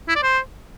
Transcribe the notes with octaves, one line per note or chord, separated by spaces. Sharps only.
E4
D5
C5